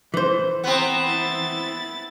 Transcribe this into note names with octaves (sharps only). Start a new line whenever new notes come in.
E3 C5
B3 C4 A#5 B5
E4 A6